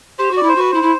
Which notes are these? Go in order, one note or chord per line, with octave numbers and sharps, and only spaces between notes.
G4 C5
F#4
D5
E4
C5
F#4 B4
E4 C5
E4